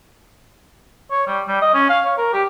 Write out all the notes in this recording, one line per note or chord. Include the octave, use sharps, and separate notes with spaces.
C#5
G3
G3
D#5
C#4
F5
C#5
A#4
G4